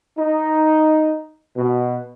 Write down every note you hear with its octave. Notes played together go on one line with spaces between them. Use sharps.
D#4
B2